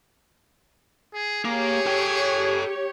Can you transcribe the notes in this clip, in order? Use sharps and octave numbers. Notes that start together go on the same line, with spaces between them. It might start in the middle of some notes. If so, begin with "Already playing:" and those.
G#4
A#3 G4 G#4 C#5
A4 G5